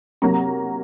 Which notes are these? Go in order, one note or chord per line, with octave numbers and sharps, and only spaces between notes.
C3 F#3 A#3 A#5